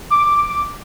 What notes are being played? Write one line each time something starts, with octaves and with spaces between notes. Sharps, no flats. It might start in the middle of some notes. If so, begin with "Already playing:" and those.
D6